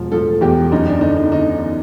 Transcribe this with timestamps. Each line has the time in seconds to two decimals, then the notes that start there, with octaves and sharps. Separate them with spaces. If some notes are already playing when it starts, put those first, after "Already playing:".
Already playing: E1 F3
0.12 F3 A4
0.41 E2 G4
0.71 F#2 D#4
0.87 D4
1.01 D3 D#4
1.17 D#4
1.31 D3 D#4